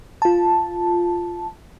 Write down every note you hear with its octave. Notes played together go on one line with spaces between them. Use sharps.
F4 A5